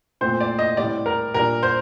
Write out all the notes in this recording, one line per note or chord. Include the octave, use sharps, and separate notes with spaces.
A#2 A3 C4 C5
D5
D#5
A2 G3 C4 D5
A#4
A#2 G3 D4 A#4
C5